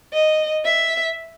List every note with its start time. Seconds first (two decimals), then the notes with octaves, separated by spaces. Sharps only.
0.13 D#5
0.65 E5